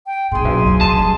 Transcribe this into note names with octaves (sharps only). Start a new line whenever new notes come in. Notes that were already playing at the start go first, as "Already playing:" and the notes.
G5
A#1 B2 G#4 C6
B1
E2 A#2
A#1 C3 A5
G3